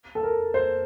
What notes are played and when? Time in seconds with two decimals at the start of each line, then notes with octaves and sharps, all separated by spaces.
0.15 A4
0.23 A#4
0.54 C5